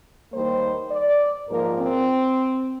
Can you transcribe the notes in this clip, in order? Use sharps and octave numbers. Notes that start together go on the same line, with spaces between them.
D#2 D#3 G3 A#3 C5
D5
G#2 F3 A#3 A#4
C4